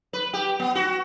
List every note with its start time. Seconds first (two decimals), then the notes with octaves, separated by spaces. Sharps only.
0.13 B4
0.33 G4
0.60 B3
0.75 F#4